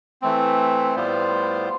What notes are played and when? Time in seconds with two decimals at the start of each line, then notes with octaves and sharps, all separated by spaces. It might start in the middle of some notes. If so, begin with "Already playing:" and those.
0.22 E3 A3 C4
0.96 A2 G3 B3 F4 C5